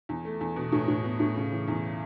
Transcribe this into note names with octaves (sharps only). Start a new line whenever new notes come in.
E2
A3
E2
B2
A2
A2
B3
A2
C#3
E3
E2